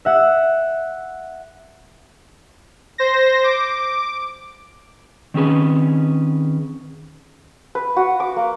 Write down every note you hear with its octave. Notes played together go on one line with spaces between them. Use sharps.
E5 F#5
C5 A#6
D6
D#3 C4 C#4 G#4 B4
B4
F#4
D6
A#3